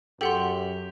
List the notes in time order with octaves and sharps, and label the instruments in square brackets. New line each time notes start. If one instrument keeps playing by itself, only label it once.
[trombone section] F#2 [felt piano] G4 [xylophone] A4 F#5 C6